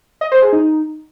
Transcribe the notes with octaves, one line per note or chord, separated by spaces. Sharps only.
D#5
C5
G#4
D#4